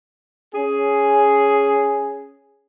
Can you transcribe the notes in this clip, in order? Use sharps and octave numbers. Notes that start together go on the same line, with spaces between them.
C#4 G#4